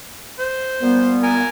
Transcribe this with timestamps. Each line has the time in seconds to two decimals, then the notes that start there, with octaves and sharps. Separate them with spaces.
0.40 C5
0.81 A#2 G3 B3
1.23 A#4 G#5